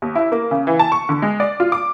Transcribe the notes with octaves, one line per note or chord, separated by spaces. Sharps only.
D#2
E4
A#3
C#3
E3
A5
C#6
D3
G#3
D5
F4
D6